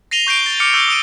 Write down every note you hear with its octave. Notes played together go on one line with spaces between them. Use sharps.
A#6 C7 D#7 F7 G7
C#6 G6 C7 D7 G7
A6
D6 F6 C#7
C#6 E6 G6 C#7 G7
D#6 D7 D#7